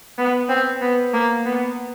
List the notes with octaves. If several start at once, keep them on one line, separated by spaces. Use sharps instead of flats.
B3
C4
B3
A#3
B3